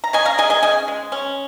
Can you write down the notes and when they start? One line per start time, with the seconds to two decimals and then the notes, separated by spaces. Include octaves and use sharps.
0.04 A#5
0.13 C#4 D#5 G#5
0.25 F5 A#5
0.38 G#3 D#5 G#5
0.50 D#5 G#5
0.63 C#3 D#5 G#5
0.88 G#3
1.12 C#4